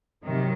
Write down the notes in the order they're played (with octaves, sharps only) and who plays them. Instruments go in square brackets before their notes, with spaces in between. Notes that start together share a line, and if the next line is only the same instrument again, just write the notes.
[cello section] C3 D#3 F#3